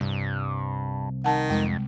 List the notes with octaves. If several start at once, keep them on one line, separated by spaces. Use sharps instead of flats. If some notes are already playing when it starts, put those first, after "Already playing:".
C2 G2
D#3 F#5 A5
F2 G#3